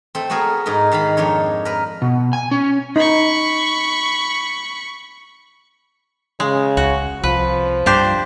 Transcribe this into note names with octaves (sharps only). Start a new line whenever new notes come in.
A3 C4
A3 B3 F#4 G#4 A#4
G#2 D#4 A#4 B4
G#2 D#3 F5 B5
F2 D4 D#4 C#5
A#4 B4
B2
G#5
C#4
D#4 B5 C#6
C#3 G#3
C#2 F#4
C2 F3 B4
G2 D4 G4 C5